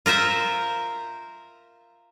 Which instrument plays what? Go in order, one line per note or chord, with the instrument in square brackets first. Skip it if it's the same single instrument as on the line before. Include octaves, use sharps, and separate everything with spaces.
[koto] F4 A#4 C5 E5